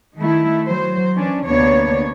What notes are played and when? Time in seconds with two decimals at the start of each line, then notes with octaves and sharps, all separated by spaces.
0.17 D#3 A3 E4
0.66 F#3 C5
1.15 E3 C#4 D4
1.46 D2 C3 A#3 B3 D4 C#5